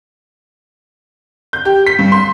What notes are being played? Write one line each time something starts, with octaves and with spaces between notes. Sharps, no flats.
G6
G4
B6
G2
C6